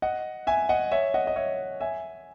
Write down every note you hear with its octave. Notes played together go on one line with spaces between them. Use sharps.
D#5 F#5
E5 G#5
D#5 F#5
C#5 E5
D#5 F#5
D#5
C#5 E5
E5 G#5